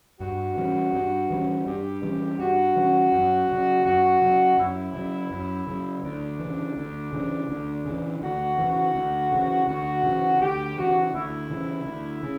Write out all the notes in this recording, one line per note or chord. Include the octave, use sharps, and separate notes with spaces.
G2 F#4
E3 G3 C#4
G2
E3 G3 C#4
G2 G4
E3 G3 C#4
G2 F#4
E3 G3 C#4
F#2
C#3 F#3
F#2 F#4
C#3 F#3
F#2 E4
C#3 F#3
F#2
C#3 F#3
D2 D4
C#3 E3
D2
C#3 E3
D2
C#3
E3
D2 F#4
C#3 E3
D2
C#3 E3
D2 F#4
C#3 E3
D2 G4
C#3 E3 F#4
D2 E4
C#3 E3
D2
C#3